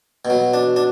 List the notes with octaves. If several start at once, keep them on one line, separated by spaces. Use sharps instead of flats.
B2
F#3
D4
D4